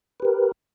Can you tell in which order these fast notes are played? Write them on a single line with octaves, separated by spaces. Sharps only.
B4 G4 A#4